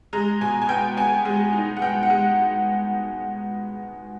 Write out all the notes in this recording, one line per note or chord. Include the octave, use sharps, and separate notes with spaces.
G#3 A#5
B2 G#5
G#5
B3 G5
B3 G#5
G#3
D#4
F#5
B3 G5
F#5
G#3